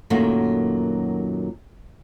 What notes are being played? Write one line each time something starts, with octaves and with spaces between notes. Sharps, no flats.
F#2 A#2 D#3 F#3 A3 A#3